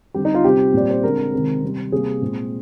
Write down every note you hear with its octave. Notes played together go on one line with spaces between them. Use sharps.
D3 G3 C4 G4
D#4
F4
C3 G3 C4 G4
A#2 G3 C4 D5
C5
D3 G#3 C4 A#4
C3 D#3 G#3 C4
C3 G3 C4
C3 G3 A#3 G#4
A#2 G#3 C4